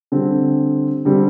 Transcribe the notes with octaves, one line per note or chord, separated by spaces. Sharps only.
D3 G3 C4
D3 G3 C4